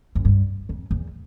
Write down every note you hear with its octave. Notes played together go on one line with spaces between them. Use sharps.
F#2
G2
F2
E2